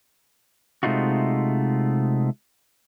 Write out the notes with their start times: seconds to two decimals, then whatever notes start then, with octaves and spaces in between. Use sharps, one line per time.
0.83 C3 G#3 A3 D#4 F4 F#4